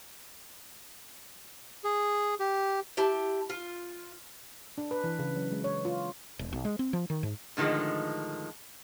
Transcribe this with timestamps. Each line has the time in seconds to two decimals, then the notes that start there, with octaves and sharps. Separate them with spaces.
1.84 G#4
2.40 G4
2.97 E4 G4 A5
3.50 F4
4.78 D4
4.91 B4
5.04 E3
5.19 C#3
5.36 F#3
5.52 G#3
5.64 C#5
5.85 F4
6.39 E1
6.53 B1
6.65 G#3
6.79 C4
6.93 F3
7.10 D#3
7.23 G#2
7.57 A2 D3 D#3 F3 G#3